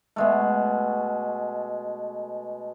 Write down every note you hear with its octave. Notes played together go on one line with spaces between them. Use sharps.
B2 G#3 A3